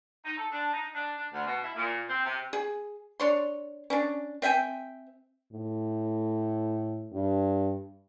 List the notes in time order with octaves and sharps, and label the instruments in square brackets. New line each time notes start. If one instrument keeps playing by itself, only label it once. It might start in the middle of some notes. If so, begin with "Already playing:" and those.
[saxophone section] D#4
A4
D4
D#4
D4
D4
D2
B2
E4
A#2
C4
C3
[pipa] G#4
D4 C#5 C6
C#4 D4
C4 E5 G5 G#5
[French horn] A2
G2